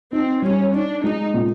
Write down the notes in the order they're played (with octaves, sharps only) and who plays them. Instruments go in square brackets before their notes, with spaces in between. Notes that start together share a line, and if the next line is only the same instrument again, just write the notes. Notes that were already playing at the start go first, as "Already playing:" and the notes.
[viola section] C4 [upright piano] D#4
[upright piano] G3 [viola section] C#4
[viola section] D4 [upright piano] D#4
[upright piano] G#3 [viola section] D#4
[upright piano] A#2